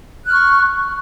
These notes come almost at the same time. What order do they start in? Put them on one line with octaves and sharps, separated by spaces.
F#6 F6 C#6